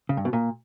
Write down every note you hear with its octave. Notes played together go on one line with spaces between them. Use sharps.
C#3
G2
B2
A#2